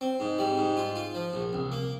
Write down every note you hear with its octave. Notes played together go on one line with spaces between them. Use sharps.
C4
G#2
G3
G#2
F4
F4
F3
A#1
C2
A#3